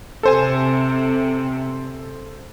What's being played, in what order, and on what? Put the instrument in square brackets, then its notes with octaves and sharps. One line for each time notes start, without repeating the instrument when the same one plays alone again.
[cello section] C3 [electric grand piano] A4 C5 G#5